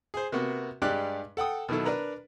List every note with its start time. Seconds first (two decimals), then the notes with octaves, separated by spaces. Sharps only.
0.14 G#4 C5
0.32 C3 A#3 B3 F#4
0.82 G2 G3 G#3 G4 D5 F#6
1.37 A4 F#5 G5 D#6
1.69 B2 D#3 F#3 E4 A4
1.86 D4 A#4 B4 A#5